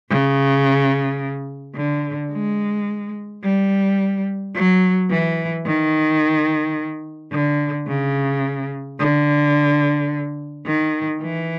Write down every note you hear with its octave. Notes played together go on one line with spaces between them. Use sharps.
C#3
D3
G#3
G3
F#3
E3
D#3
D3
C#3
D3
D#3
E3